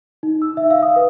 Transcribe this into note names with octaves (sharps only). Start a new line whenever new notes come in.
D#4
E6
E5
F5
D#6
B4